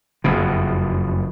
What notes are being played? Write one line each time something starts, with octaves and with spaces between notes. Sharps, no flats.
F#1 F2 B2